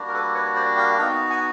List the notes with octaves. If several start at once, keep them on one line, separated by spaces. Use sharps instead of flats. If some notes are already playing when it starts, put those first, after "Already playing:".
Already playing: G3 A#3 D4 F#4
A#4
A4 B4
B4 C#5
C5 D5
F5 G5
B3 D#4 F#4 F5 G5
F#5 G#5